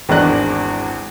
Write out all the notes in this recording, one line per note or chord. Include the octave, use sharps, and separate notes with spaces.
G#1 E2 D4 D#5 F#6